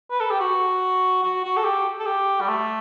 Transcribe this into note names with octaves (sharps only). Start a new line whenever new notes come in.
B4
A4
G4
F#4
F#4
F#4
A4
G4
A4
G4
G3
A3